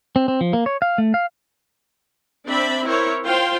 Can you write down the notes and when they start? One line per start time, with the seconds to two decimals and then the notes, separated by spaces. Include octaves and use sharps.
0.16 C4
0.28 C4
0.41 F3
0.53 A#3
0.66 C#5
0.82 F5
0.98 A3
1.14 F5
2.46 C4 D4 D5 E5 B5
2.85 E4 A#4 C5 C#5
3.25 F4 C5 F5 G5 C6